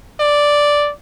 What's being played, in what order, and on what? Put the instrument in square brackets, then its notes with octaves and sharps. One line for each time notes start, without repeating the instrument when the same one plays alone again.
[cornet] D5